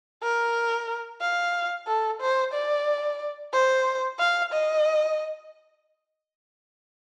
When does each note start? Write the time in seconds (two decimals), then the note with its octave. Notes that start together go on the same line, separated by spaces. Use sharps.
0.23 A#4
1.21 F5
1.87 A4
2.21 C5
2.54 D5
3.53 C5
4.19 F5
4.52 D#5